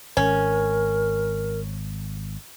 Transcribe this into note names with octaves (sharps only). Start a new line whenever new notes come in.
G#1 C#4 A#4